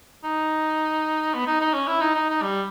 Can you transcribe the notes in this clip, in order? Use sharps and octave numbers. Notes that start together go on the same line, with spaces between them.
D#4
B3
D#4
D#4
C#4
E4
D#4
D#4
D#4
G3